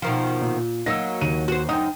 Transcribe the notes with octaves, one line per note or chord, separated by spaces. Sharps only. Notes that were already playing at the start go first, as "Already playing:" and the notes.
B2 D#3 F3
A#2
F#3 A#3 D#4 E6 A#6
D#2 D#7
F#4 C5
F#2 D#4 G5 D#6